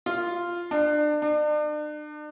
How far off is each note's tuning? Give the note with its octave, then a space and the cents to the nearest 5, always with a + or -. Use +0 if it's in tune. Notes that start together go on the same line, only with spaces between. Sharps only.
F4 -5
D4 +30
D4 +40